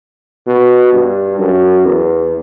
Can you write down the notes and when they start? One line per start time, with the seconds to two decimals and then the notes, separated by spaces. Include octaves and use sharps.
0.47 B2
0.93 G2
1.39 F#2
1.85 E2